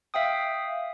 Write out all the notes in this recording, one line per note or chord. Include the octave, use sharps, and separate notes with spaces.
E5 F5 G5 D#6